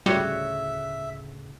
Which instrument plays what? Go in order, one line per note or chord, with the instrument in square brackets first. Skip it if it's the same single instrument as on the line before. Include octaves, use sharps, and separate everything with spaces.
[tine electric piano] D2 A2 C#3 [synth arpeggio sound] G3 [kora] F#4 C#5 [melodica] E5